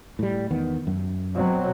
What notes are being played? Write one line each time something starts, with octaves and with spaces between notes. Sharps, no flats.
A2 G3
E2 D#3 B3
F#2
B2 F#3 C4